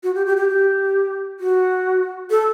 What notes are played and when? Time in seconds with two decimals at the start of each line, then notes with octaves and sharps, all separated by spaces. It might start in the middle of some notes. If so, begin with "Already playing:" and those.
0.03 F#4
0.15 G4
0.26 G4
0.37 G4
0.49 G4
1.40 F#4
2.30 A4